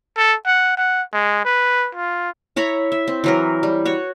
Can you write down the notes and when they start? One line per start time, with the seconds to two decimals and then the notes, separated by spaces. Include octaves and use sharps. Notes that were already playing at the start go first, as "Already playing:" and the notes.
0.17 A4
0.46 F#5
0.77 F#5
1.13 G#3
1.45 B4
1.95 F4
2.56 E4 C#5 A#5 B5
2.92 E5
3.08 C4
3.24 E3 F#3 A#4
3.63 G3
3.85 F#4 C#5